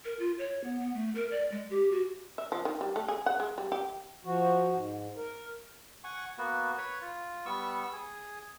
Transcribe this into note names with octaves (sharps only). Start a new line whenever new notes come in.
A#4
F4
C#5
B3
B3
A3
A#4
D5
G#3
G4
F#4
E5
F3
D#3
G3
A3
G#4
F#5
G#3
G3
G4
F3 F#4
G#2
A#4
F#5 G#5 C#6
A#3 B3 F#4
B4 C#5
F4
G3 B3 C#6 E6
G#4